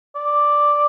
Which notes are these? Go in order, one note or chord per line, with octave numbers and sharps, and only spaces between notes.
D5